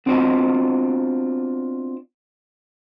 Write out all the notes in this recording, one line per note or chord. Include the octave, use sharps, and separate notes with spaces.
B3 C4 D4 F4 F#4 D#5